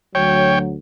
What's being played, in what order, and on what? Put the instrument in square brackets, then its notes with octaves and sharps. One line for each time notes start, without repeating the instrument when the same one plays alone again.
[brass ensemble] D2 F#3 [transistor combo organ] C#5 G5